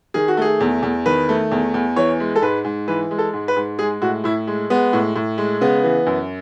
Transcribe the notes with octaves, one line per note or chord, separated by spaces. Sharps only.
D#3 G#4
F#4
A3 G#4
E2
E2
D#3 B4
A3
E2
E2
E3 C#5
G#3
A4
G#2 B4
G#2
E3 B4
G#3
A4
G#2
B4
G#2
G#3 G#4
A2 F#4
A2 E4
G#3
G#3 B3
A2
A2
G#3
C#3 B3
E3
F#2